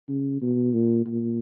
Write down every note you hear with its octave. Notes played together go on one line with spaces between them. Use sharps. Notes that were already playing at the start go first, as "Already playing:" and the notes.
C#3
B2
A#2
A#2